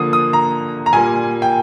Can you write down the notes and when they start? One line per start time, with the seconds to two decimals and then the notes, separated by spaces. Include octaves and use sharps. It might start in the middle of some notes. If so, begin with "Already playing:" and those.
Already playing: D3 F3 A#3 D#6
0.13 D#6
0.33 A#5
0.86 A#5
0.93 A#2 G3 A#3 G#5
1.42 G5